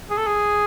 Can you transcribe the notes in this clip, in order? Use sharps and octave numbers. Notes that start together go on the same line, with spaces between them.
G#4
A4
G#4